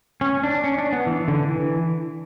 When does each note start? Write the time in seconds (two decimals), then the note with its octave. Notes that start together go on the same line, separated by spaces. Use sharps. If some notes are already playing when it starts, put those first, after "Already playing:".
0.21 C#4
0.43 D4
0.64 C#4
0.78 D4
0.93 B3
1.07 E3
1.28 D3
1.49 E3